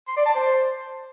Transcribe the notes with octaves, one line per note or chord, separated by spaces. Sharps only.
C6
D5
A5
C5